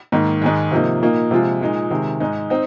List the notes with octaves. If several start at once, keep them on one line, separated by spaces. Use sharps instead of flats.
G#2 D#3 A#3
G#2 D#3 G#3
C3 F3 A#3 D#4
A#2 A#3 D#4
C3 F3 G#3 F4
A#2 G#3 D#4
C3 D#3 G#3
G#2 G#3 D#4
C4 D#4